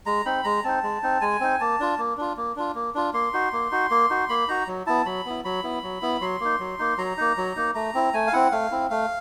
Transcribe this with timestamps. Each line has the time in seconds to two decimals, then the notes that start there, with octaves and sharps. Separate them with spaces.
0.06 G#3 A#5
0.25 C4 D#4 B5
0.44 G#3 A#5
0.64 C4 D#4 A5
0.83 G#3
1.03 C4 D#4
1.21 G#3 G#5
1.40 C4 D#4
1.60 A#3 A5
1.80 D4 F4
1.98 A#3
2.17 D4 F4
2.37 A#3
2.56 D4 F4
2.75 A#3
2.95 D4 F4
3.14 A#3 C6
3.33 D#4 F#4
3.53 A#3
3.71 D#4 F#4
3.91 A#3
4.10 D#4 F#4
4.29 A#3 B5
4.48 D#4 F#4 A#5
4.67 F#3
4.86 B3 E4 A5
5.06 F#3 B5
5.26 B3 E4
5.45 F#3 B5
5.64 B3 E4
5.83 F#3
6.02 B3 E4
6.21 F#3 C6
6.40 A#3 D#4
6.60 F#3
6.79 A#3 D#4
6.98 F#3 A#5
7.17 A#3 D#4
7.37 F#3
7.56 A#3 D#4
7.75 A3 A#5
7.94 C4 E4
8.13 A3 G#5
8.27 F5
8.33 C4 E4 F#5
8.52 A3 F5
8.72 C4 E4
8.90 A3 F5